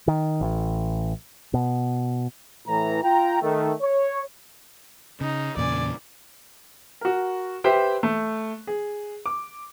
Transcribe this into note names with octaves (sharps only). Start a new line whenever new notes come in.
D#3
A1
B2
A2 E3 A#5
F4 G5 A#5
D#3 A3
C#5
C#3 D#4
E2 A#2 C#3 D5 G#5
F#4 A#4
G4 B4 C5 E5 G5
A3
G#4
D6